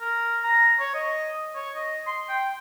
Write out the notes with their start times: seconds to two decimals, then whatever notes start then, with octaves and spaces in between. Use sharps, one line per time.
0.01 A#4
0.44 A#5
0.79 C#5
0.95 D#5
1.55 C#5
1.75 D#5
2.07 C6
2.29 G5